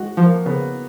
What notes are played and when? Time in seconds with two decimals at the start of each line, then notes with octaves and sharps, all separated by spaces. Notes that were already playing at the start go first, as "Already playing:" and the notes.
Already playing: G#3 F#4
0.17 F3
0.24 A#3
0.46 C#3 B3